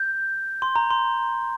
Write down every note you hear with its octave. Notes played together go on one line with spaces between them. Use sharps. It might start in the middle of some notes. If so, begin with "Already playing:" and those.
Already playing: G6
C6
A#5
C6